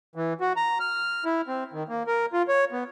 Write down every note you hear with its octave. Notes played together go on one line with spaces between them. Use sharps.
E3
F#4
A#5
F6
E4
C4
D#3
A#3
A#4
F4
C#5
B3